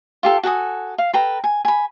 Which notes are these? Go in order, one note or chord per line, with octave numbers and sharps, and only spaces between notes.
F4 G4 A4
F#4 A4 G#5 D#6
F5
A4 B4 G5 A#5
G#5
G#5 B5